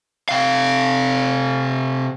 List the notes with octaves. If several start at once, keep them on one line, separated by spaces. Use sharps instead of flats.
C3 F5